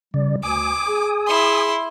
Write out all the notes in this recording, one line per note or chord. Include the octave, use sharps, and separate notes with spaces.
C#3 G3 D5
D2 G#5 D6 D#6
G#4
E4 C6